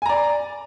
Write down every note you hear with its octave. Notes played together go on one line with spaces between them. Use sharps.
D5 G#5 A#5